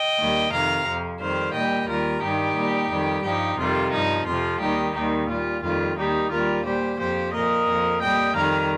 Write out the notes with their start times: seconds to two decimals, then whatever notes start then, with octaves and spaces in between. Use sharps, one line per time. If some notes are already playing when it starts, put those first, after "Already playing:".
Already playing: D#5 G5
0.18 D#2 D#3 G3
0.52 F2 C3 D#3 F5 A#5
0.86 F2 F3
1.20 F2 D#3 G3 C5 F5
1.54 A#2 G3 D#5 G5
1.88 D#2 D#3 G3 F4 A#4
2.22 G2 D#3 G3 D#4 G4
2.56 A#2 G3
2.90 F2 D#3 G3
3.24 G2 F3 D#4 G4
3.58 F2 C3 D#3 G3 F4
3.92 G2 F3 D#4
4.26 F2 C3 F3 F4
4.60 D#2 D#3 G3 D#4 G4
4.94 D#2 D#3 G3 D#4
5.28 A#2 G3 F4
5.62 F2 D#3 G3 F4
5.96 D#2 D#3 G3 D#4 G4
6.30 D#2 D#3 G3 F4 A#4
6.64 A#2 G3 G4 C5
6.98 F2 F3 G4 C5
7.33 A#2 F3 A#4 D#5
7.67 F2 F3
8.01 A#2 G3 D#5 G5
8.34 F2 D#3 G3 F5 A#5